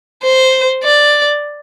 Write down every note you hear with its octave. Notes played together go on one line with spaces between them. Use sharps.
C5
D5